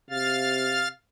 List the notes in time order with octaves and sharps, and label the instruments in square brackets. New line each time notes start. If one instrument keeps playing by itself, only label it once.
[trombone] C3 [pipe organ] F5 F6 A6